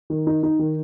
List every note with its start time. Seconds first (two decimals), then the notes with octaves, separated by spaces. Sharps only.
0.10 D#3
0.27 D#4
0.43 D#4
0.59 D#3